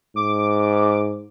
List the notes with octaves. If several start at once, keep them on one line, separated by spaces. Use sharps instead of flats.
G#2 D6